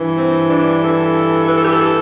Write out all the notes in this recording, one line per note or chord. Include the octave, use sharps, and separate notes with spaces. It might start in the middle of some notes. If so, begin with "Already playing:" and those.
Already playing: G2 E3
C4
D4
A4
B4
A4
G4
A4